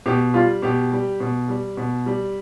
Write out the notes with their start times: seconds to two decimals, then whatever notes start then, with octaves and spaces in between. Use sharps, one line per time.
0.06 B2 G4
0.34 G3 F4
0.62 B2 G4
0.92 G3
1.20 B2
1.48 G3
1.77 B2
2.06 G3